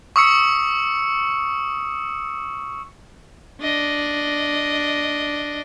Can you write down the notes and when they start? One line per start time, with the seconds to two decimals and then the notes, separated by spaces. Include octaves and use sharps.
0.16 C#6 D#6 E6 C#7
3.61 D4 D#5